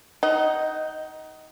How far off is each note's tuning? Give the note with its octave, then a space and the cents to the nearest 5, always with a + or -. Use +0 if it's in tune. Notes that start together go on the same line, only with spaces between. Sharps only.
D#4 +15 D#5 +0 F#5 +35